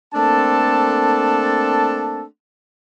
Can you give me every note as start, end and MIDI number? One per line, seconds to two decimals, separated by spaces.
0.15 2.24 57
0.15 2.24 58
0.15 2.24 60
0.15 2.24 62
0.15 2.24 69
0.15 2.24 81